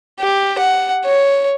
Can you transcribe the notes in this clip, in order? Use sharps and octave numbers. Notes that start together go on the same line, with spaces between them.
G4
F#5
C#5